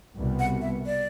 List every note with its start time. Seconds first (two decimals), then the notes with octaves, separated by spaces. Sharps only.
0.15 C2 B2 G3 B3
0.39 F#5
0.61 E5
0.86 D5